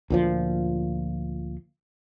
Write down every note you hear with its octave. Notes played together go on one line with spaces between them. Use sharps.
D2 A#2 F3